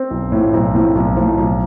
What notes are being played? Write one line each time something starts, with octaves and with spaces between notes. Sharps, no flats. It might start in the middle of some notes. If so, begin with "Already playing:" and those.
Already playing: C4
B1
A2 F3
B1 C4
A2 F3
B1
A2 F3
B1